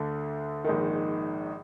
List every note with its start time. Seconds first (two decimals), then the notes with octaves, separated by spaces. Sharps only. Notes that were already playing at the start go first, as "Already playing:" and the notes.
Already playing: D2 D3
0.64 A#1 G#2 D#3